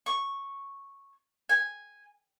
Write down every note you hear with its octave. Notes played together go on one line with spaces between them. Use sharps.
C#6
G#5